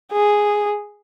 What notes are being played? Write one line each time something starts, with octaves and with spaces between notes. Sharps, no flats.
G#4